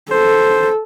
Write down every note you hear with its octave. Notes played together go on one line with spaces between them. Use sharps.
A4 C5